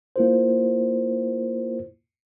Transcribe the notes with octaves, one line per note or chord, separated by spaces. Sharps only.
A#3 E4 F4 A#4 C5